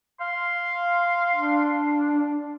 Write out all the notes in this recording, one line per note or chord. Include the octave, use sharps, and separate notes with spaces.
F5 C6
D4